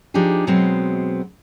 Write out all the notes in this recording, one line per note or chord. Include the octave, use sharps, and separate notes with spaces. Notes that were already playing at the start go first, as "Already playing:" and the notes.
F3 D4 D#4 G4 G#4
B2 F#3 G#3 B3 C4